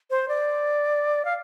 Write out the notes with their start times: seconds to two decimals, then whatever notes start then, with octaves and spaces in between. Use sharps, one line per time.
0.10 C5
0.28 D5
1.25 F5